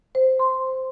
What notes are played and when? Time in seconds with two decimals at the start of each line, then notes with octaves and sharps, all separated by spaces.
0.15 C5
0.39 C6